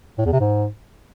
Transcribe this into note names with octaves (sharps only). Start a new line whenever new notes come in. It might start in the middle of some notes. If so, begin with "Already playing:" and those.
A2
E2
C3
G#2